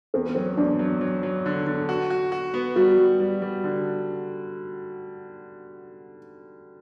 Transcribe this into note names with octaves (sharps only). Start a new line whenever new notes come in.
E2 C4
B3
F#3 C4
E2 D4
F#3
F#3
F#3
D3
D3
F#4
F#4
F#4
B3
G3 F#4
G3
G3
G3
D3